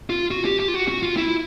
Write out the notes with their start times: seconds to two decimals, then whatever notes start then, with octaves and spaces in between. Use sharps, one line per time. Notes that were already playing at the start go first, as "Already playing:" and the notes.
0.10 F4
0.31 F#4
0.45 G4
0.60 G4
0.68 F4
0.74 F#4
0.88 F#4
1.03 F4
1.17 E4